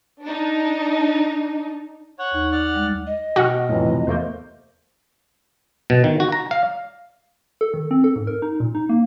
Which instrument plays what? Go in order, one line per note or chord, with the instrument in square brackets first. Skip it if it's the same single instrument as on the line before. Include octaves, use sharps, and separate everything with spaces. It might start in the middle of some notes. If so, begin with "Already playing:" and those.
[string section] D4 D#4
[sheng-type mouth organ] C#5 F#5
[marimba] D#2 D#4
[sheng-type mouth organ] D5 F#5 F6
[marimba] G3 G#3
[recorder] D#5
[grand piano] B2 G5 F6 [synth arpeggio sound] F#4
[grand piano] B1 F2 C3 [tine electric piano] A2 E3
[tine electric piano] E2 A3 A#3 [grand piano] C5 G6
[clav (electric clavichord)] B2
D#3
F#4
A#5
F5
[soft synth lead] A4
D#3
C4
A4
G#2
A#4
D#4
A#2
D#4
A#3